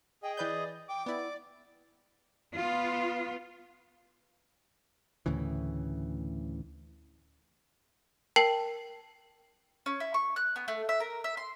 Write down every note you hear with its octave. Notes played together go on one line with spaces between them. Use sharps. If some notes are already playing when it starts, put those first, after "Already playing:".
G#4 D#5 G5
E3 B4 D5 G6
G5 D6
B3 E4 D5
B3 F4
D2 A2 C#3 E3
A#4 G5 A5 C7 F#7
C#4
E4
C#6
F#6
B3
A3
E5
A#4
E5
C6